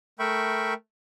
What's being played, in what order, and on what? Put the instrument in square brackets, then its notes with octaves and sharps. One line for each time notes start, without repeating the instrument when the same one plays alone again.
[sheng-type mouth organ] A3 A#4 E5 G5 B5 C#6